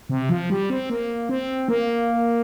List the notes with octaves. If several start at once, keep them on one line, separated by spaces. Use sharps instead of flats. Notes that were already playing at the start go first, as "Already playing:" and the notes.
C3
F3
G3
C4
A#3
C4
A#3